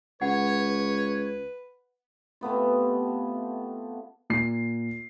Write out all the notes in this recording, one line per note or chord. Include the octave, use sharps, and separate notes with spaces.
C#2 B4 C#5 F#5
C3 A3 B3 F4
A#2 C7